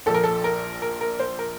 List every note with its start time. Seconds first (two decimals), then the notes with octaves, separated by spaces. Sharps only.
0.06 A#1 A#2 F3 A4
0.14 A#4
0.24 A4
0.44 A#4
0.82 A#4
1.01 A#4
1.20 C5
1.39 A#4